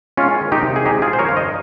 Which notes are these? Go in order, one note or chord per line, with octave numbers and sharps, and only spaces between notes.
G#3 C#4 F4
D#3
D#4 G4
C3
G#4
G#3 D#4 G4
F4 G#4
F3
C5
A#4 C#5
G2 F5
C5 D#5